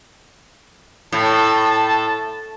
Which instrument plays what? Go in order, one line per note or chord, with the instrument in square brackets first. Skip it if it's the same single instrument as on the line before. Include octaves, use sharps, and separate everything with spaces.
[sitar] A2 [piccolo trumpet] A5